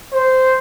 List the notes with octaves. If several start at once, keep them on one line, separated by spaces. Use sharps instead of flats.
C5